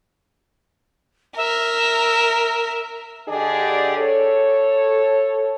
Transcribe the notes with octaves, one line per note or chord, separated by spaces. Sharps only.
A#4 E5
D3 D4 G4 G#4 D5 D#5
A4 C#5